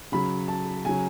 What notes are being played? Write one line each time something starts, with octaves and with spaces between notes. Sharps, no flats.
C#3 F#3 B5
A5
C#3 F#3 G#5